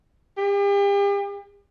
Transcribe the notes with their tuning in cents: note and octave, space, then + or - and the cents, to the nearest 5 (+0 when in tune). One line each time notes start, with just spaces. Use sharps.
G4 +40